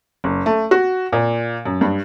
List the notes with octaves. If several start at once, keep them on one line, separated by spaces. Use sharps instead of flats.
F#1
A3
F#4
A#2
F#2
G2